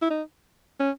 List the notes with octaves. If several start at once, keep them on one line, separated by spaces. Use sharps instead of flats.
E4
D#4
C#4